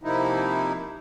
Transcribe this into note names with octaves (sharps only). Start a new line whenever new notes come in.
C3 F3 A#3 D#4 E4